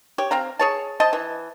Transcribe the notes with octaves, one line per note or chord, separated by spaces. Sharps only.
G4 C#5
C4 F5 A#5
G#4 C#5 A5
C5 D#5 A5
E3